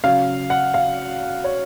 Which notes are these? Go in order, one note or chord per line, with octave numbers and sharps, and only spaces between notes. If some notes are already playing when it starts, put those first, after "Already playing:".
C#3 F#3 F5
F#5
F5
C#5